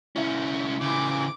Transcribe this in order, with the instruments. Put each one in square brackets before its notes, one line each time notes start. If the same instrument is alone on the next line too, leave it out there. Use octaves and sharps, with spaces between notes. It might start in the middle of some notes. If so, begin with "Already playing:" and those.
[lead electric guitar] C2 C#4 [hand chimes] E4 E5
[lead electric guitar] C#3 E3 [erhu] D6